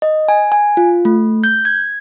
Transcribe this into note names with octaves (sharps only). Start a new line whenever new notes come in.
D#5
G#5
G#5
F4
A3
G6
G#6